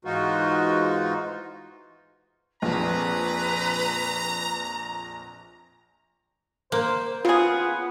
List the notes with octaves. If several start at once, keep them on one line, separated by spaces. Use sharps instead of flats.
G#2 E3 G#3 D#4 F4 F#4
A#1 F2 B4 A#5
A#3 C5
C#3 B3 F4 G#4